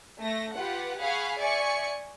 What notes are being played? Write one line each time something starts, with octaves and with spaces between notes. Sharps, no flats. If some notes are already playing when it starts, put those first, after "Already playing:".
A3 A#6
F4 G4 B4 F#5
G#4 F5 F#5 G#5 B5 C#6
D5 E5 G#5 C#6 C#7